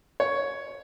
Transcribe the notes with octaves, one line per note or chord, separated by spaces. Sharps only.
C#5